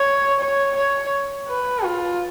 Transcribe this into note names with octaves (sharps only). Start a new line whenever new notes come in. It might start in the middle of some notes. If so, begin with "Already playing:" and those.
Already playing: C#5
C#5
C#5
B4
F4